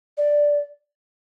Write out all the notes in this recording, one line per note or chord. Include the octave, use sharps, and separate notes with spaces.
D5